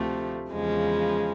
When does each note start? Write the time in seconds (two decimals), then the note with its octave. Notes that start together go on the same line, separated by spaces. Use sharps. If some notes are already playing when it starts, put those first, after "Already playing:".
Already playing: D2 C3 F3 A3
0.51 E2 C#3 F3 G#3